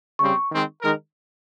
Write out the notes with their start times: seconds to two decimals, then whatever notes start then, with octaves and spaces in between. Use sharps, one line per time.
0.19 C#3 G3 C4 C#6
0.50 D#3 G#3 C4
0.81 D#3 G#3 D#4 A#4